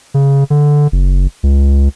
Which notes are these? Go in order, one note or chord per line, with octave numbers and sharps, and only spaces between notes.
C#3
D3
F#1
C#2